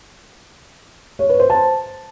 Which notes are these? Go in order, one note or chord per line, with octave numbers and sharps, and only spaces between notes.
C#5
B4
C5
A5